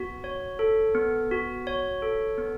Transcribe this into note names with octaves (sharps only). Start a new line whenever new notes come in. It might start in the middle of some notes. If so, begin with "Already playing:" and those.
Already playing: B3 F#4
C#5
A4
B3
F#4
C#5
A4
B3